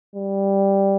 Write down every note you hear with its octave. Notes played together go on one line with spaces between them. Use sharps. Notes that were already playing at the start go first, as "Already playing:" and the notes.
G3